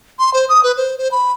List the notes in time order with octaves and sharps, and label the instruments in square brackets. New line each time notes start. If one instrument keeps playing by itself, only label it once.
[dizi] C6
C5
D#6
B4
C5
C5
B5